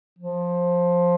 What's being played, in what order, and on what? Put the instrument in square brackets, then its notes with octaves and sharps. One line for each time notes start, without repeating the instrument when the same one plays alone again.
[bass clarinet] F3